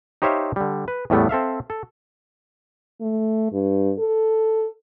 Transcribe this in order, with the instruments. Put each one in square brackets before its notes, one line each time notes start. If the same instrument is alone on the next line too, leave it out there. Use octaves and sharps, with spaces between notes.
[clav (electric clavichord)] D#4 G4 C5 C#5 E5 F5
D3 G3
B4
E2 A2 G3 A3 B3
C4 A4 E5 F5
A4
[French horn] A3
G2
A4